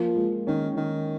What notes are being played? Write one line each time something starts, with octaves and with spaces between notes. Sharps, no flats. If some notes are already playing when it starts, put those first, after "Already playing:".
Already playing: F3 A#3
G#3
D#3 C#4
D#3